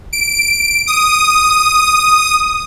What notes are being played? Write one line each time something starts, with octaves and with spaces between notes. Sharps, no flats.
D7
D#6